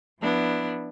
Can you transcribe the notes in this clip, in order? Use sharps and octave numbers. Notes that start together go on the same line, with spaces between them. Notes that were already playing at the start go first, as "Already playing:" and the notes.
F3 B3 D4 E4